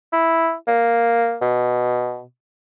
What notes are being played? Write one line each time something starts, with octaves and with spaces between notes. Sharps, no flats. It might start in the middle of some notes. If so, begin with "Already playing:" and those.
E4
A#3
B2